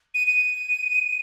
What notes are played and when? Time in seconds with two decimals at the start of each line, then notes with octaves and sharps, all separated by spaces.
0.14 D#7
0.27 D#7